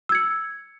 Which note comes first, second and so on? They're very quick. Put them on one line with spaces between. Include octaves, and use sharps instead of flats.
E6 G#6 C#7